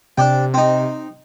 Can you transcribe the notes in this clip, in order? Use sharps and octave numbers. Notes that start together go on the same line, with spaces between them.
C3 D4 D5 G5
C4 D#4